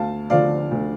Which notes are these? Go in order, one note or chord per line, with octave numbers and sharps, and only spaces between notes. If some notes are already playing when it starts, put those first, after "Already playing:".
Already playing: D2 F5 A5
D3 F3 D5 F5
D2